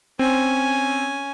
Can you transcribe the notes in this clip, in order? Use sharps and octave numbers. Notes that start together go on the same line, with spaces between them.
C4 C#4 G#5